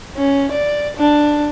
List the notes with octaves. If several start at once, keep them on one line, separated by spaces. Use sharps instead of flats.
C#4
D5
D4